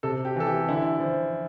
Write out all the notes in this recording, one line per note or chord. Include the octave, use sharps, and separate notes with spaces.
C3 A4
G4
E3 A4
G4
D3 E4
F3